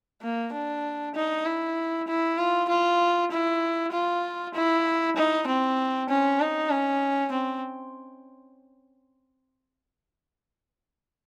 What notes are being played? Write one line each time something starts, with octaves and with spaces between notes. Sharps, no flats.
A#3
D4
D#4
E4
E4
F4
F4
E4
F4
E4
D#4
C4
C#4
D#4
C#4
C4